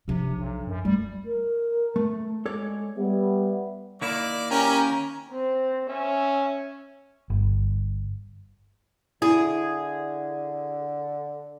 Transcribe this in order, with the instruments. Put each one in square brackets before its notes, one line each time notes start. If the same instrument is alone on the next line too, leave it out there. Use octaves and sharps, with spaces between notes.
[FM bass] C3 [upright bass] F3 D4
[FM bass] B1
F#2
[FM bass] G3 [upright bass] A3
[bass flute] A#4
[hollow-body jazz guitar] A3
[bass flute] G#3 [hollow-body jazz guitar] A4 C#5 D5
[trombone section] G3 B3 [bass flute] E5
[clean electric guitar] D#3 A#3 E4 [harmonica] D5
[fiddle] C#4 [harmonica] G4 A#4 [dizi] A#5
[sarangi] C4
[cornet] C#4 [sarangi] E5
[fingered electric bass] G1
[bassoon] D3 [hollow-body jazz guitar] E4 [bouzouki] G#4